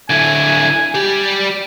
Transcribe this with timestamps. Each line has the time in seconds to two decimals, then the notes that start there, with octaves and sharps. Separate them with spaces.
0.10 D3 E4 G#5
0.95 G3 G4